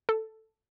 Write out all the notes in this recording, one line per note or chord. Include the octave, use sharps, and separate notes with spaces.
A4